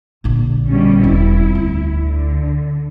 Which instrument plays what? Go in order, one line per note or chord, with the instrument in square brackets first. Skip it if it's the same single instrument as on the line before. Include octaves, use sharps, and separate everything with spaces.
[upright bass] A#1 D3
[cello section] B2 G3 C#4
[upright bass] E1 C4 [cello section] E4
[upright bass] D2
[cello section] D3